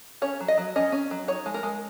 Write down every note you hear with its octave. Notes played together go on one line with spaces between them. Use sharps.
C#4 C#5
F#3
D#5
F#3
C#4 D#5
C#4
F#3
D#4 C#5
G#3
A#4
G#3